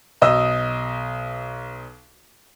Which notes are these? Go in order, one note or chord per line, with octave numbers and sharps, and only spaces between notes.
B1 D#5 E6